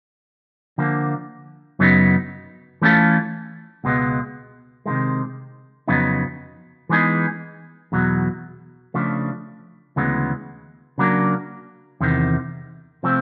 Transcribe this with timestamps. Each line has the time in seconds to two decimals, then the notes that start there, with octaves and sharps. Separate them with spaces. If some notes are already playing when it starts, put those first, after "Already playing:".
0.78 D3 F3 A#3
1.79 F#2 C#3 F#3 B3 D#4
2.82 E3 A3 C#4 F4 A4
3.84 C#2 B2 G#3 B3
4.86 C3 D#3 G#3
5.88 F2 C#3 F#3 B3 D#4
6.89 E3 G#3 B3 D#4 G#4
7.92 E2 B2 F#3
8.94 C#3 F3 A3 D4
9.96 D2 C#3 E3 G#3 B3
10.98 C#3 F#3 A#3 D4
12.01 E2 C3 D#3
13.03 C3 F3 A3 C4